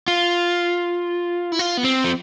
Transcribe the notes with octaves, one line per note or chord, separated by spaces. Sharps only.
F4
E4
F4
B3
C4
F3